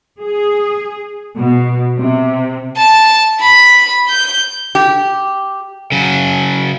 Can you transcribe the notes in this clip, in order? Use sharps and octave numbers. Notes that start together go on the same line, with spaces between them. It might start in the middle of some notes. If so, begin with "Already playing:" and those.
G#4
B2
C3
A5
B5
G6
G4
C#3 F#3